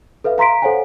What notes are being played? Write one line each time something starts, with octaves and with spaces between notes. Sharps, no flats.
A4 B4 E5 F5
F5 A#5 C6 B6 D7
A4 C5 C#5 F5 F#5 G#5